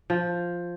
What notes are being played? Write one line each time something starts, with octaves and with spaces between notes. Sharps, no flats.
F3